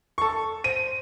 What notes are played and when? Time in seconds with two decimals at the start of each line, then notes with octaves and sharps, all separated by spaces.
0.18 A4 C#6
0.64 C5 D#7